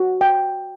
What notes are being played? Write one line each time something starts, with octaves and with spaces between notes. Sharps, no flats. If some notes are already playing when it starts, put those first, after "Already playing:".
Already playing: F#4
G5